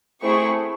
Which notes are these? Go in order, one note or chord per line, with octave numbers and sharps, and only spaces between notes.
A3 C4 E4 G#4 C#6